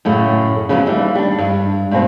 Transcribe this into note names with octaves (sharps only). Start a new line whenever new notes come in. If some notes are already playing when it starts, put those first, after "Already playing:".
F#2 A2 C#3
C#3 F3 F#3 B3 D4
D#2 E3 G3
G3 D4
G2
G2 B2 C4